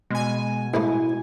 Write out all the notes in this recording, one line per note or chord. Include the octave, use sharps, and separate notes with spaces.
B2 G#3 G#5
A1 G#3 A3 E4